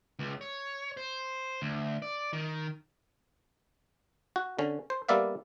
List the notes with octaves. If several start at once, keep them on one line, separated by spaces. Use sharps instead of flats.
C#2
C#5
C5
D2
D5
D#3
F#4
D3 C#4
C5
G3 A#3 B3 D5 E5 F5